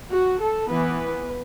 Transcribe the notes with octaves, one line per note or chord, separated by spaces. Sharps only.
F#4
A4
E3 B3 B4